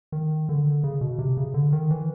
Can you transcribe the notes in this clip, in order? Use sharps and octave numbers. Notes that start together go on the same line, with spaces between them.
D#3
D3
C#3
B2
C3
C#3
D3
D#3
E3